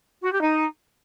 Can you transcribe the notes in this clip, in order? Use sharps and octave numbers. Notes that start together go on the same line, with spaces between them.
F#4
G4
D#4